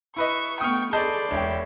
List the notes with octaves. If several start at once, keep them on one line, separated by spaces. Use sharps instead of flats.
E4 B4 D#5 E5 C#6
A3 B3 G5 C#6 D#6 F6
G#4 A4 B4 D5 D#5 A5 C6 G6
E1 C#5 E5 G5